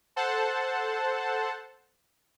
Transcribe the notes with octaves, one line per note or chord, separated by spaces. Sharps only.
A4 C5 F#5 A5